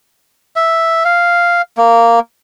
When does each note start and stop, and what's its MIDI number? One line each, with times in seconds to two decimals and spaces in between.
0.56 1.03 76
1.05 1.62 77
1.77 2.19 58